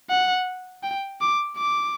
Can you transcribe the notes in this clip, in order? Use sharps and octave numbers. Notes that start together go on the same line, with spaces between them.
F#5
G5
D6
D6